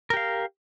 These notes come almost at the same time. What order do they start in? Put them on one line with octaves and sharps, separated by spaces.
A#4 G4 F5